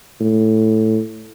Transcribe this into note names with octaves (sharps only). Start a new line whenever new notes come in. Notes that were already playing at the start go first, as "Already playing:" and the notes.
A2